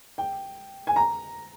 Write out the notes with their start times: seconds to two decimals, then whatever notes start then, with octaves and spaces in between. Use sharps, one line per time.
0.18 G5
0.87 G#5
0.96 A#5